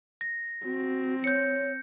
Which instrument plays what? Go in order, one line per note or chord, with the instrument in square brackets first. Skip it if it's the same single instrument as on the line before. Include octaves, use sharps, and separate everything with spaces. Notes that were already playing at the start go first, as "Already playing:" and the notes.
[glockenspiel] A#6
[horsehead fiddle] C4 [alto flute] F#4
[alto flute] C#5 [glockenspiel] G6 C#7